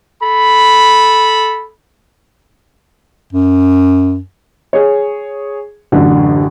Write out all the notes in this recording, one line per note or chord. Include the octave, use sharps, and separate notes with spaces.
A4 B5
F#2
G#4 C#5
A1 F#2 D3